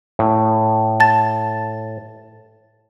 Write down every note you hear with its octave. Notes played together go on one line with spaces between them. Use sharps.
A2
A5 A6